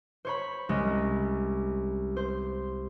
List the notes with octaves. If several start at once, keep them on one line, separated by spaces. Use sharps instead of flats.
C5 C#5 B5
C2 G#3 C#4
C5